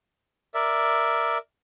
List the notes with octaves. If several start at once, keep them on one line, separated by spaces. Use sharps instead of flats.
A#4 D5 E5